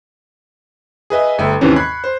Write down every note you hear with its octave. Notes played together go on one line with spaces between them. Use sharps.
G#4 B4 D#5 E5
G1 A3 E5 G5
D#2 G#2 C3 E3 C#4
B5 C#6 F#6 G#6 C7
C5